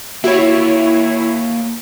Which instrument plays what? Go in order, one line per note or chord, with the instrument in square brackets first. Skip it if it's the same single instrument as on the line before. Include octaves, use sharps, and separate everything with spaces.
[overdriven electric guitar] A#3 G4 [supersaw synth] E4 C#5 [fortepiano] F#4